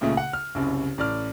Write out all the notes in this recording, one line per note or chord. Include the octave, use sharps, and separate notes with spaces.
C#2 A#2 C#3 A3
F#5
F6
F#1 C2 F#2
A1 D5 F6